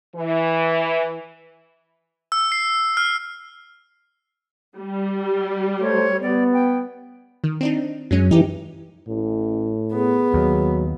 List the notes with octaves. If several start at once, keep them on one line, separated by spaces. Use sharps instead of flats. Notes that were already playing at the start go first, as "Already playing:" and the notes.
E3
E6
C7
F6
G3
A3 C5 C#5
B3 D5
G5
D#3
C4 D4 D#4
F#2 F#3 G#3 C#4
E3 D#4 G4
A1 A2
B3 G#4
D#2 F#3